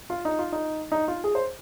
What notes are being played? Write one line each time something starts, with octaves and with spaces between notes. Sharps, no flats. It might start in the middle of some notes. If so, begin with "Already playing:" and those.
F4
D#4
F4
D#4
D#4
F4
G#4
C5